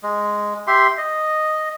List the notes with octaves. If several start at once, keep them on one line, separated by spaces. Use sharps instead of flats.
G#3
G4 E5 C6
D#5